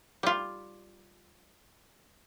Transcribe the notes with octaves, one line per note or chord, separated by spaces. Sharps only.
G3 F4